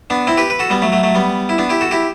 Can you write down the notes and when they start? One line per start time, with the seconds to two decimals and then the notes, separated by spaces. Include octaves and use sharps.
0.10 B3 D4
0.27 C4 E4
0.37 G4 B4
0.50 B4
0.59 F#4 A4
0.70 G3 B3
0.82 F#3 A3
0.92 F#3 A3
1.03 F#3 A3
1.15 G3 B3
1.49 E4
1.58 B3 D4
1.70 E4 G4
1.81 F#4 A4
1.91 E4 G4